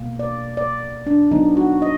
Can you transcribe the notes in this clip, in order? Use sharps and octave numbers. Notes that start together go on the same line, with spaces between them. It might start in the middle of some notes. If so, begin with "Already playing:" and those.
Already playing: B2 A#3
D5
D5
D4
D3 F#3 B3 D#4
F#4
D#5